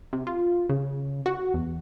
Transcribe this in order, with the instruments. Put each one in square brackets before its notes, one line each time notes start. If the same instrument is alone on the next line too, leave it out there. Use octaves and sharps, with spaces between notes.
[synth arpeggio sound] C3
F4
C#3
F#4
E2